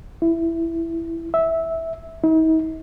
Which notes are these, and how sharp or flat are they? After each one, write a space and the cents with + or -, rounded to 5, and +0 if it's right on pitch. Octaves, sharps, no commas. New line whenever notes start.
E4 +5
E5 -10
D#4 +45